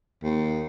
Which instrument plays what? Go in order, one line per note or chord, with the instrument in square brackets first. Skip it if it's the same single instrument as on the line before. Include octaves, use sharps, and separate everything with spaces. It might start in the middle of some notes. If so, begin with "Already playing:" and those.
[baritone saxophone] D#2